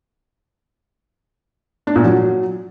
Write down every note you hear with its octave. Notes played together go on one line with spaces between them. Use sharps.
D4
A#2
F#3